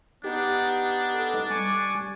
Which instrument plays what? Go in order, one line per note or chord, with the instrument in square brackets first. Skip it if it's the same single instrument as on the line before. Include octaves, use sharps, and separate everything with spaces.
[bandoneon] B3 D#4 [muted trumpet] D4 [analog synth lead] G4
[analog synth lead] A4
[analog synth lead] G3 [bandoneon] G#5 C#6 D6